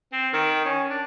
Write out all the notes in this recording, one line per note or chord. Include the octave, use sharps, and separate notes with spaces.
C4
D#3
C#4
D4